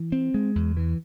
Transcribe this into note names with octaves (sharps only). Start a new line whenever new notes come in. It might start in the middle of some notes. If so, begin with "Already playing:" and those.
Already playing: E3
C4
G#3
E2
E3